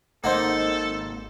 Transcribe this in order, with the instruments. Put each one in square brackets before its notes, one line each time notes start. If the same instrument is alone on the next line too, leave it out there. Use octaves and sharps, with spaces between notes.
[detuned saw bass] G#1 [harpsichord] A#3 D#4 [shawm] A4 [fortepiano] C5 F#5